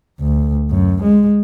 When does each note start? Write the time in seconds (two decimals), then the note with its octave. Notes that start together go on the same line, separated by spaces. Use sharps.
0.20 D2
0.71 F#2
1.03 G#3